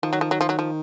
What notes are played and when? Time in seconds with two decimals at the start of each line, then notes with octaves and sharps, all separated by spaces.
0.03 D#3 F3
0.13 F#3
0.21 F3
0.31 F#3
0.41 F3
0.49 F#3
0.59 F3